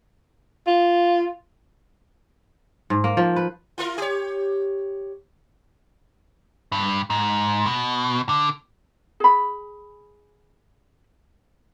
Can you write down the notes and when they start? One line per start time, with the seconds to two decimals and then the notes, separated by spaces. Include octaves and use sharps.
0.67 F4
2.90 G#2
3.04 A#3
3.17 F3
3.36 B4
3.78 E4 F4 A#4
3.98 G4 C#5
6.72 G2
7.10 G#2
7.66 B2
8.29 D3
9.20 G#4 B5